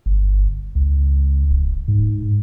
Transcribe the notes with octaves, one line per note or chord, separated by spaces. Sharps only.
G1
C#2
D1
G#2